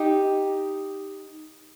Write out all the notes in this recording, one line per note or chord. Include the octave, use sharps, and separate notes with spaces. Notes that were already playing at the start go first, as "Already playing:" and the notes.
Already playing: D#4 G4